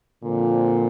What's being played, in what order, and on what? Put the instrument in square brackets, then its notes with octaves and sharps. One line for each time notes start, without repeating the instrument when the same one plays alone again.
[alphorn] A#2 [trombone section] D3 F3 C4